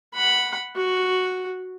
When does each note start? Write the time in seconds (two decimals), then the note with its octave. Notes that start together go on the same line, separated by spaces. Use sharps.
0.14 F#5 B5
0.76 F#4